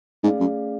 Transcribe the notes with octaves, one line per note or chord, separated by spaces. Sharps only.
G#2 A3 C#4 G#4 D5 F5
F#2